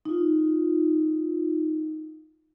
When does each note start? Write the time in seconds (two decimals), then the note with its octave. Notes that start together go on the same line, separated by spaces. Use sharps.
0.05 D#4 F4